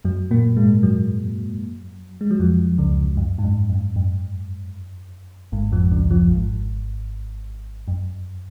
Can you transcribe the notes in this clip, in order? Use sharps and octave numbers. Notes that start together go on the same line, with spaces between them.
F#2 F#3
A#2 A#3
G#2 G#3
F#2 F#3
G#3
F#3
F2 F3
C#2 C#3
F#2
G#2
F#2
F#2
F#2
G#1 G#2
F2 F3
C#2 C#3
F2 F3
G#1 G#2
F#2